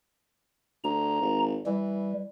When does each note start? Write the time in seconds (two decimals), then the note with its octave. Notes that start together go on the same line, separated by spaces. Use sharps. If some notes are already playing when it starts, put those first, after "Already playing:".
0.84 D2 A#5
1.21 G#1
1.66 E3 G3